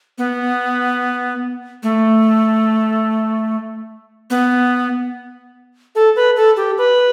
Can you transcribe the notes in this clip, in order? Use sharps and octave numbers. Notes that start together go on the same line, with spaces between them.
B3
A3
B3
A4
B4
A4
G4
B4